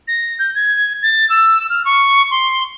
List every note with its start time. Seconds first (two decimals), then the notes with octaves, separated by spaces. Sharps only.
0.08 A#6
0.39 G6
0.55 G#6
1.03 A6
1.30 E6
1.70 F6
1.85 C#6
2.31 C6